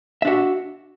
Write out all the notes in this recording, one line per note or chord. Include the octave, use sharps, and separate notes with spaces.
D4 F#4 E5